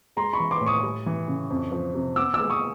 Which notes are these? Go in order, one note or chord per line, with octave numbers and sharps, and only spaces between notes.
G#3 A#5 C6
B5 C#6
E3
C6 D6
A2
C#6 D#6
G3
E3
C#3
F2
F3
C3
B3 D6 E6
D6 E6
G#3
C#6 D#6